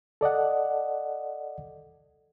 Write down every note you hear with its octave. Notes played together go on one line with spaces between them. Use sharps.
A4 D5 D#5 F#5